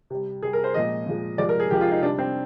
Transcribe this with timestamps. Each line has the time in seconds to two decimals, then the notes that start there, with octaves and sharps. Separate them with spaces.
0.10 C3 G3
0.43 C3 G3 G#4
0.53 A#4
0.64 C5
0.74 A#2 F3 G#3 D#5
1.06 A#2 F3 G#3
1.38 C3 F3 G#3 D5
1.49 A#4
1.60 G#4
1.70 C3 F3 G#3 G4
1.81 F4
1.92 D#4
2.02 C3 D4
2.06 G3
2.19 C4